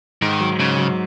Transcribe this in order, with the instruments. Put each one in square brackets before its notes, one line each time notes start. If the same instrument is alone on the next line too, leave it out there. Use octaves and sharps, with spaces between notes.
[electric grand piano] G#2 [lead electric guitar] D#3
[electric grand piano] F#3
[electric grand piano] G#2 [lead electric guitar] C#3
[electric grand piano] F#3